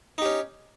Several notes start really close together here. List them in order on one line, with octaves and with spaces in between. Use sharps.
D#4 G4 C#4